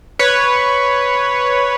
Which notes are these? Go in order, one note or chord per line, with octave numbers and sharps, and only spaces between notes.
B4 C#5